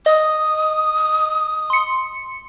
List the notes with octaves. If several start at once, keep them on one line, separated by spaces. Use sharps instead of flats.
D#5 D#6
C6 C#7